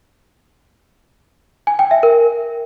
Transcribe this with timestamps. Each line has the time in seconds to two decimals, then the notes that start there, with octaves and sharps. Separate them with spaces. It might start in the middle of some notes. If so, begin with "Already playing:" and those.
1.67 G#5
1.79 G5
1.91 E5
2.03 A#4